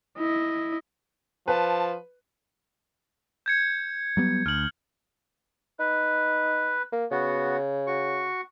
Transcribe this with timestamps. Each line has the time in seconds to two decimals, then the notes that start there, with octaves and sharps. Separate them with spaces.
0.18 E4 D#5
1.48 F3 B4 A5
3.46 G6 G#6 C#7
4.17 F#3 G3 B3
4.46 D2 F6 F#7
5.79 D#4 B4
6.92 A#3
7.11 C#3 B3 F#4
7.87 F#4 C#6